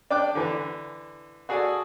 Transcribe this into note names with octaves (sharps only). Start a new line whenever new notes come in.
D4 G5 D6 F#6
D3 E3
F#4 G#4 A4 D5 D#6